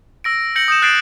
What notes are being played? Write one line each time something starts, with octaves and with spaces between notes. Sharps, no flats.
E6 A#6 D7
G6 A#6 C#7 F#7
D#6 G6 C#7 E7
F#6 A6 C7 D7 E7